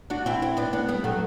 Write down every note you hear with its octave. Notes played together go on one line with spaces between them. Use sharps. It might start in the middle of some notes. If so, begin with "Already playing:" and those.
D4 F#4
C4 E4
C4 E4
B3 D4
B3 D4
G3 B3
F#3 A3